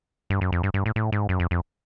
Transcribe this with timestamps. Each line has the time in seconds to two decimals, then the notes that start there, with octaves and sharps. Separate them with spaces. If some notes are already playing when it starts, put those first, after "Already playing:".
0.30 G2
0.41 F#2
0.52 F2
0.63 G2
0.74 G2
0.86 A2
0.96 A2
1.12 G#2
1.29 F#2
1.40 F2
1.51 F2